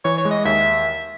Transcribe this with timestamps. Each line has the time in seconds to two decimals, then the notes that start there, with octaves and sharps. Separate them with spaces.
0.04 E3 C#5
0.18 C#5
0.25 G#3
0.31 D#5
0.45 D#2 E5